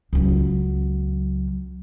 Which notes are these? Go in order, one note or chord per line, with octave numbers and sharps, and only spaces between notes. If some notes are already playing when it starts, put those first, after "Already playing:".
C#2 F#3